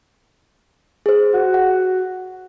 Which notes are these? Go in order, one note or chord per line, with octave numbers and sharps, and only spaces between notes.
G#4 C5
F#4
F#5